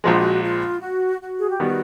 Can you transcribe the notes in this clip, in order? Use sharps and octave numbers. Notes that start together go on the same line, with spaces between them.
A#1 A#2 F3 G#3 F#4
F4
F#4
F#4
G#4
G4
D#3 G3 B3 F#4